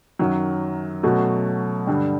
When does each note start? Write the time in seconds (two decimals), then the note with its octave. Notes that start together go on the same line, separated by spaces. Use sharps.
0.19 F#2 D#3 F#3
1.03 B2 F#3 A3 C#4 F#4
1.87 G2 D3 G3